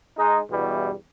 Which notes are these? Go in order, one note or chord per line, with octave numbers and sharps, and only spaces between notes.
G#3 D#4
E2 G2 B2 E3 G3